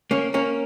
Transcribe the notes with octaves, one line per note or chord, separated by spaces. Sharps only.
A#3 C#4
A#3 C#4